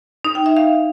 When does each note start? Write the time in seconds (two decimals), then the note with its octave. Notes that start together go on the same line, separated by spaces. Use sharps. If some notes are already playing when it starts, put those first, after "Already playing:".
0.24 D#4
0.35 G5
0.46 E5
0.56 F5